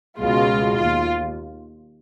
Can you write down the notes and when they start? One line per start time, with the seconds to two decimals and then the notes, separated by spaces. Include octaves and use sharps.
0.19 C#2 B2 G#3 F4
0.76 D#2 F4